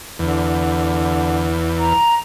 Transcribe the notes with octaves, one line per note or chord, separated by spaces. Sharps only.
E2 D3
A#5